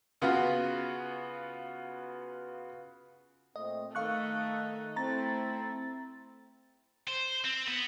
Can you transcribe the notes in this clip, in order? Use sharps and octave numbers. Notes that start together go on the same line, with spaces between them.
C#3 B3 F4 F#4
A#2 A3 C4 D#5
D#3 A3 D#4 A4 F5 C#6 F#6
A3 C4 E4 A#5 A6
C5
C4
B3